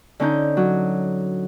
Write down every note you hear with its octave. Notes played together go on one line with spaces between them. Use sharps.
D3 C#4 D#4 G6
F#3